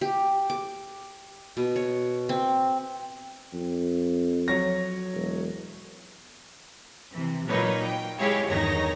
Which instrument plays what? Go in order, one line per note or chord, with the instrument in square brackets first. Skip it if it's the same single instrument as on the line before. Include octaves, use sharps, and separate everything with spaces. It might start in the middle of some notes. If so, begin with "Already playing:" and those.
[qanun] G4
D6
B2
C#5
C4
[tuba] F2
[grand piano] F#3 C#5 A#6
[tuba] E1
[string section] C3 E3
A#2 F#3 A#3 D#4 B4 C#5
G5
G#3 E4 G4 G#4 C#5 F5
E2 G2 D#3 D#4 C#5 A#6